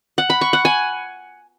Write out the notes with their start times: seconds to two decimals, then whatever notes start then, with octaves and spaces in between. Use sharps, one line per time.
0.18 F#5
0.30 B5
0.41 C#6
0.53 F#5
0.65 G#5